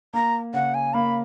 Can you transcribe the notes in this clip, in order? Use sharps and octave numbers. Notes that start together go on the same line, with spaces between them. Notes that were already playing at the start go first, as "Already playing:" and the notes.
A#3 A#5
C#3 F#5
G#5
A#3 B5